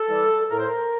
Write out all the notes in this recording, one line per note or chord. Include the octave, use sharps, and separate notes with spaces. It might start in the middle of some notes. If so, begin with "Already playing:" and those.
Already playing: A4
E3 G3
A2 A#4
C5
A#4